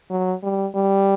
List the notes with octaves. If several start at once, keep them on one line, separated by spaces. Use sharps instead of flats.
F#3
G3
G3